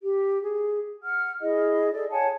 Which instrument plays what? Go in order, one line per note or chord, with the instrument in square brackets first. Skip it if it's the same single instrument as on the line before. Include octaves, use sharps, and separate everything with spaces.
[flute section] G4
G#4
F#5 F6
E4 G#4 D#5
G#4 A4 D5
C#5 F#5 G#5 A5